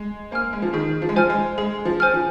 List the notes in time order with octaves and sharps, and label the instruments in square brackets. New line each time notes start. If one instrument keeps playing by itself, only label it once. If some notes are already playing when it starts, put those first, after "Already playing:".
Already playing: [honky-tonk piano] G#3
[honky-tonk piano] A#3 [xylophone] C5 G#5 F6
[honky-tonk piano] G#3
F3
[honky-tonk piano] D#3 [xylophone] G#4
[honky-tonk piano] F3
G#3
[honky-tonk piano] F3 [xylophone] C5 G#5 F6
[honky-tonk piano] G#3
[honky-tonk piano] G#3 [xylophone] G#4
[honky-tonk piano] F3
[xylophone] C5 G#5 F6
[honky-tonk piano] F3